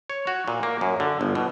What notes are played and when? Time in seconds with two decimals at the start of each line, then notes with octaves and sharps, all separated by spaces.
0.10 C#5
0.27 F#4
0.48 A#2
0.63 A#3
0.81 F#2
1.00 D3
1.21 G1
1.35 B2